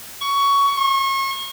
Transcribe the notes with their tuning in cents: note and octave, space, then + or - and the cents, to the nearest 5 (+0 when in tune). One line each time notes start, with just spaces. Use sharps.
C#6 +15
C#6 -35